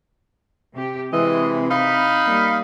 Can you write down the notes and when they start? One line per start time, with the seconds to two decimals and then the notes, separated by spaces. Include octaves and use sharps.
0.73 C3 G4
1.13 C3 E3 G#3 D#5
1.71 D#4 F5 B5
2.25 G3 A#3